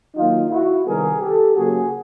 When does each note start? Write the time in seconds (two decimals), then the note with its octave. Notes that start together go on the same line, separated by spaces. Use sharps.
0.16 D#3 F#3 A#3 D#4 F4
0.51 E4 F#4
0.86 C3 D#3 G3 B3 G#4 A#4
1.21 G4 A4
1.56 C#3 F#3 A#3 F#4 G#4